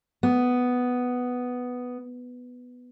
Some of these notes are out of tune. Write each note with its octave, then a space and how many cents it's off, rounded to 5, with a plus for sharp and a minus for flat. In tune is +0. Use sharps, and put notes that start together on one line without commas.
B3 +5